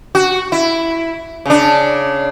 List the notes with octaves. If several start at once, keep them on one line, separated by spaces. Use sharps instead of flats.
F#4
E4
C#3 D4